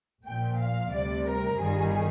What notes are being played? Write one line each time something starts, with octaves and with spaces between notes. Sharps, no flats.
A#1 A#2 F3 G5
F5
D2 C3 G3 D5
A#4
G1 G2 D#3 G3 G#4